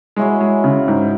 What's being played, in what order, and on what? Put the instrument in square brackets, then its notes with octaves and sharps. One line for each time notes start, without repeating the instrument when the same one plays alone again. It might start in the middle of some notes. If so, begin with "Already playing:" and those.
[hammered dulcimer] F#3 E4 C#5 [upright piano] G#3
[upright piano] G#3
C#3
G#2